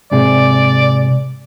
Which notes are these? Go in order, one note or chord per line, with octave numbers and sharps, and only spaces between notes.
G#2 C3 G#4 D5